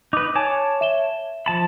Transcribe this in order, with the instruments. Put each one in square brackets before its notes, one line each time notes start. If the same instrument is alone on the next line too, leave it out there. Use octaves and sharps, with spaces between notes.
[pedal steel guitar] D#4 B4 [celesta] D6
[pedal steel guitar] C#5 A5 D6 [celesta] G#5
[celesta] E5 E7 G7
[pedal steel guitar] F3 A5 B5